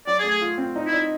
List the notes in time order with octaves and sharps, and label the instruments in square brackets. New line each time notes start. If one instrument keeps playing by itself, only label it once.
[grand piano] F#3 [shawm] D5
[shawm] G#4
[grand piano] A3
[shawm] G#4
[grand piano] F4
C4
D#4
[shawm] E4
[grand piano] D#4